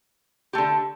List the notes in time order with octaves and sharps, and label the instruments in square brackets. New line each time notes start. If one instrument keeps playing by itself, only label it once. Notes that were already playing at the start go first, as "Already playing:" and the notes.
[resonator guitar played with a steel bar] D3 A3 G4